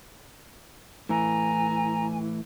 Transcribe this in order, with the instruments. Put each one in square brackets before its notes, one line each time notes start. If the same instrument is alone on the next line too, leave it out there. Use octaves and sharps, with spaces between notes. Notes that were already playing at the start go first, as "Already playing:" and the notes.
[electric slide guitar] A2 E3 [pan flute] G#5 [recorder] A#5